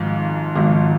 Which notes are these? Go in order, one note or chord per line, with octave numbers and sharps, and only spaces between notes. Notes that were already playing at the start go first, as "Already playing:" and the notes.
Already playing: G#1 G#2 F3 F5
G#1 G#2 F3